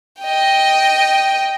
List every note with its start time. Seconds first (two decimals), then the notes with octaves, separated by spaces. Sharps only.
0.21 D#5 G5